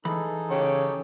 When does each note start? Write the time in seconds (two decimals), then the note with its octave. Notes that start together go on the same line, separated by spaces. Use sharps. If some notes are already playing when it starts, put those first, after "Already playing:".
0.05 E3 D#4 G#4 A4 B5
0.50 C#3 G4 C#5 G5